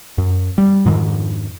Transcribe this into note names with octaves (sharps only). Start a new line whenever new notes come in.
F#2
G3
F2 G#2 D#3